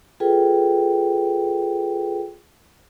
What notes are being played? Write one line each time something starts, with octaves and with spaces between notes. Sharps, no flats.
F4 G#4 A4 B4 G5